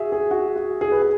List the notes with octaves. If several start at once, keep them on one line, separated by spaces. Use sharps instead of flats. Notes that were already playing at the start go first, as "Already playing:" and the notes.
Already playing: F#4 G#4 E5
G#4
F#4
F#4
G#4
B4
G#4